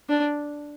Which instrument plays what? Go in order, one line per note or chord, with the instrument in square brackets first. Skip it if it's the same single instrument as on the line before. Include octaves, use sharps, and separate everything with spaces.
[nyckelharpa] D4